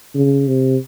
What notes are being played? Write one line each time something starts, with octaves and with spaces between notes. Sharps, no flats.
C#3
C3